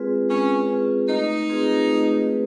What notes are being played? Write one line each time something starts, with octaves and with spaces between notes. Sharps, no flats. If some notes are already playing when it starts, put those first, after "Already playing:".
Already playing: G#3 C4 F4 G#4 B4
G#3 C#4
C4 F4 G#4 B4
A3 D#4
C4 F4 G#4 B4
A3
B4